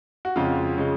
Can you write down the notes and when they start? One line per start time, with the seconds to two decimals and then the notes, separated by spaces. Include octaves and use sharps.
0.25 F#4
0.36 F2 C#3 G#3 F4
0.78 C#3 G#3